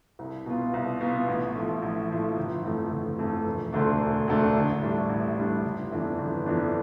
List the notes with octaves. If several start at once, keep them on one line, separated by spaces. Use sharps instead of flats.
C2
B2 B3 F4
C2
B2 B3 F4
A1
A2 F3
A1
A2 F3
G1
F2 E3 A3
G1
F2 E3 A3
E1
D2 D3 A3 D4
E1
D2 D3 A3 D4
A1
A2 G3 D4
A1
A2 G3 D4
G1
F2 E3 B3 D4
G1
F2 E3 B3 D4